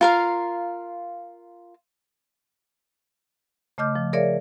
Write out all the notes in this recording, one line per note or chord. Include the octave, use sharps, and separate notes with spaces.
F4 A#4 F5
C#3 A3 D#5 D6 F6 G6
F3
G#4 A#4 C#5 D5 E5 F5